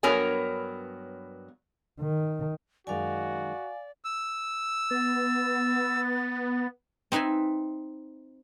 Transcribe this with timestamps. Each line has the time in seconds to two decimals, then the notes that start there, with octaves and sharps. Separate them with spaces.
0.03 G2 F#3 B3 A#4 C#5 G#5
2.00 D#3
2.87 F#2 D#3 G#3 F#4 D5 F5 G#5
4.04 E6
4.91 B3 A6
7.12 C4 D#4 B4 E5 G#5